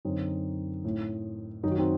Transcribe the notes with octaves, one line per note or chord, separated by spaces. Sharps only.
F#2 D3 C4 D#4
A2
F#2 D#3 D#4 F#4
C4 D#4